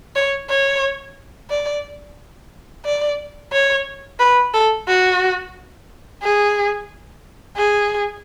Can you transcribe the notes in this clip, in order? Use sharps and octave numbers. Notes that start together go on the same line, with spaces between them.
C#5
C#5
D5
D5
C#5
B4
A4
F#4
G#4
G#4